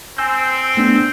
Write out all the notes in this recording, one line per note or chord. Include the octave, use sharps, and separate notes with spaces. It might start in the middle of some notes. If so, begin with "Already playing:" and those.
C4 G#5 E6 G6
A3 B3 D4